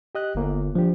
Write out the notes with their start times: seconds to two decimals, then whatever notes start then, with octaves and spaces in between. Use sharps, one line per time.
0.15 G4 D#5 F#6
0.35 G1 D#2 A#3
0.75 F3 D4 G4